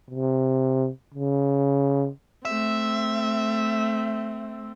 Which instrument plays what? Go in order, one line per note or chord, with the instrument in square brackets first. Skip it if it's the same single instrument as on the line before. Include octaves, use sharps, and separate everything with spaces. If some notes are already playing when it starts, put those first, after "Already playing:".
[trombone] C3
C#3
[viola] A3 C4 [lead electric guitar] E5